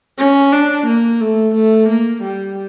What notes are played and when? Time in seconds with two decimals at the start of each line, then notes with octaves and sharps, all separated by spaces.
0.18 C#4
0.52 D4
0.86 A#3
1.21 A3
1.55 A3
1.89 A#3
2.23 G3